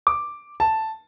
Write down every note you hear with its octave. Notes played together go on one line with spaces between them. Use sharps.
D6
A5